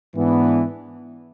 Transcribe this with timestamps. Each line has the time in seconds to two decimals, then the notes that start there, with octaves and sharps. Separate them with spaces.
0.15 G#2 E3 B3 D4